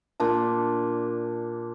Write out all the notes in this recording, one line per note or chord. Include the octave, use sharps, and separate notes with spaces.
A#2 D4 A5